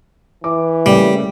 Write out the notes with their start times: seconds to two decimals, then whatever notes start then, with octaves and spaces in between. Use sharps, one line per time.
0.44 E3 D6
0.86 C#3 G3 A3 A#3